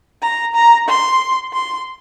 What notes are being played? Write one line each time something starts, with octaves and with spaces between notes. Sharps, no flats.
A#5
A#5
C6
C6